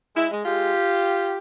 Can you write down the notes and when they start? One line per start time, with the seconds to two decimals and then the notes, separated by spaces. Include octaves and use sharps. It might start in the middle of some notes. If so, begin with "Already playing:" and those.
0.16 G#3 E4
0.31 G#3
0.45 G#3 F4 G4